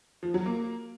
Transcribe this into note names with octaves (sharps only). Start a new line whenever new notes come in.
F3
F#3
A#3